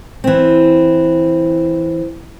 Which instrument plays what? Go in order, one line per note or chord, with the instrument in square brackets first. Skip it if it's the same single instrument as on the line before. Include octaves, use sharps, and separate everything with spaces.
[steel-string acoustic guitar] E3 C4